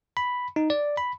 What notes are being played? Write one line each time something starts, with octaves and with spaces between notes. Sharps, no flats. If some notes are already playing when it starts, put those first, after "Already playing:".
B5
D#4
D5
B5